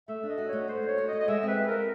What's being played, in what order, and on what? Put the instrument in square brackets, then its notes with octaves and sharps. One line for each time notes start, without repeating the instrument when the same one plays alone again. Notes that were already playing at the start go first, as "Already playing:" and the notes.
[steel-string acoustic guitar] A3 [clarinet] E5
[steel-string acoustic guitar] D4
[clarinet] D#5
[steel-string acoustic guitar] F#4
[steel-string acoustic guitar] A3 [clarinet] C#5
[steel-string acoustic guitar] A3 [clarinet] C5
[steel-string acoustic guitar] D4
[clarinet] C#5
[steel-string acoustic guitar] F#4
[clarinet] D#5
[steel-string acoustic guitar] A3
[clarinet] D#5
[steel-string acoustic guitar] G#3 [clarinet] E5
[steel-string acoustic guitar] C4 [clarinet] B4
[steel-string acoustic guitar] F4
[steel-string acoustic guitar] G#3 [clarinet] A#4